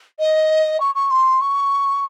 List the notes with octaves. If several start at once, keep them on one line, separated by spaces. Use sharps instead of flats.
D#5
C#6
C#6
C6
C#6